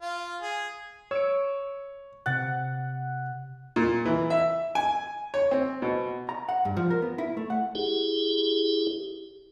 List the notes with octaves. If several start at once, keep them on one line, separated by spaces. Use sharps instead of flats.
F4
G#4
C#5 E6 C#7 D7
C3 F#5 F#6 A6
A#2
E3
E5
G#5
C#5
C4
B2
A#5
F#5
G2
F3
A#4
B3
E4
A3
F#5
E4 G4 G#4